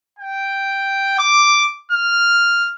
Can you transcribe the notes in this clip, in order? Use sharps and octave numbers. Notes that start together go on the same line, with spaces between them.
G5
D6
F6